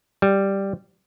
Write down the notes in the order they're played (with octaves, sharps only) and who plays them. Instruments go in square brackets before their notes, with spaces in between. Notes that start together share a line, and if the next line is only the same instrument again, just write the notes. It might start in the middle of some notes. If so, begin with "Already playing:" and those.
[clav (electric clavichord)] G3